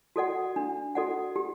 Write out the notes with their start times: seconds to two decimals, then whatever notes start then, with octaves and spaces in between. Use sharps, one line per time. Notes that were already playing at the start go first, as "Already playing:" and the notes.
0.16 F#4 A4 D5 F#5
0.56 D4
0.95 F#4 A4 D5 F#5
1.36 G4